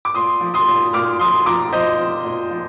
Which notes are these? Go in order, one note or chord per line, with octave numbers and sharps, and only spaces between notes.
D6
A#2 C6 D#6
F3
C6 D#6
A#2
A#2 D6 F6
F3 C6 D#6
F3 A#5 D6
F3 C5 D#5
F3
A#2
F3